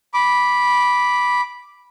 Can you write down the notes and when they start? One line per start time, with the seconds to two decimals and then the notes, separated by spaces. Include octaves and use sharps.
0.14 B5 D6